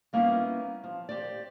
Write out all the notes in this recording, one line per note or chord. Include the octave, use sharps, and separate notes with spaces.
G3 A#3 B3 C#4 D#4 E4
F3
G4 C5 D5